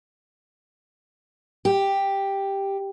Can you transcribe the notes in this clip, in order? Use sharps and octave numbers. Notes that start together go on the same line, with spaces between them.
G4